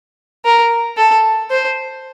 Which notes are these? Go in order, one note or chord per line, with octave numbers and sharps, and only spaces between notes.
A#4
A4
C5